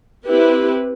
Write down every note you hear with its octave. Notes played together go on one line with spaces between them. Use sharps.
C4 E4 G4 B4